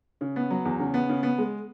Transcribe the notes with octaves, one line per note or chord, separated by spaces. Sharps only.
C#3
B3
F#3
E2
C#3
B3
C#3
B3
G#3